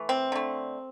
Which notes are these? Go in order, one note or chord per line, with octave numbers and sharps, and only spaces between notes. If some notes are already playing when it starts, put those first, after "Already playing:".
Already playing: E3 A3
C4
D3 A3